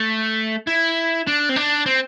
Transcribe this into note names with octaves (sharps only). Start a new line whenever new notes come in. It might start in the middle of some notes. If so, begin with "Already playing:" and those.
Already playing: A3
E4
D4
C4
D4
C4